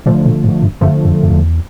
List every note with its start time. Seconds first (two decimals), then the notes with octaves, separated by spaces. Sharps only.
0.06 A#2 D3 F3 A3
0.26 A#2
0.44 G#2
0.62 G2
0.81 F#2 D3 F3 A3
1.05 F2
1.23 F2
1.30 E2